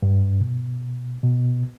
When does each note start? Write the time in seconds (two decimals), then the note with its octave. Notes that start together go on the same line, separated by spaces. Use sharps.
0.03 G2
0.41 B2
1.23 B2